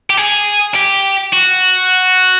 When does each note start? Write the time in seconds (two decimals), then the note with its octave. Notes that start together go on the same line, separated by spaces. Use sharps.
0.10 G4
0.17 G#4
0.76 G4
1.33 F#4